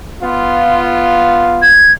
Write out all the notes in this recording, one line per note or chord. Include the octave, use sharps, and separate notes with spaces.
B3 F4
G#6